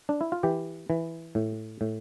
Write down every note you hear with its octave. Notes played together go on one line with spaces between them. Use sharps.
D4
E4
F4
E3 G4
E3
A2
A2